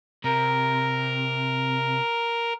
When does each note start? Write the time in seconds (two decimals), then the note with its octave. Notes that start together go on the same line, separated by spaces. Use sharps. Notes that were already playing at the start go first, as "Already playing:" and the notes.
0.24 C3 A#4